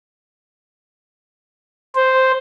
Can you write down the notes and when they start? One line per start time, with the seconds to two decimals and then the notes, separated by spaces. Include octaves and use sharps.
1.95 C5